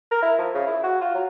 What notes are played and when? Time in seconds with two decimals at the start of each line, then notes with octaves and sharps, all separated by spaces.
0.11 A#4
0.22 E4
0.38 F3
0.54 C#3
0.66 E4
0.83 F#4
1.01 F4
1.14 F#3